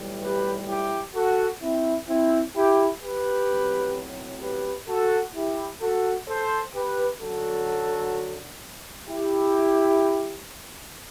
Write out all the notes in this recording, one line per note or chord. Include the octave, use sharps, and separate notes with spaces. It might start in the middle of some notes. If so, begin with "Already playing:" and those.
Already playing: B1 A2 E3 G3
G4 B4
E4 G4
F#4 A4
C4 E4
C4 E4
E4 G4
G4 B4
B1 A2 F#3 C4
G4 B4
F#4 A4
E4 G4
F#4 A4
A4 C5
G4 B4
F#2 D3 F#3 F#4 A4
E4 G4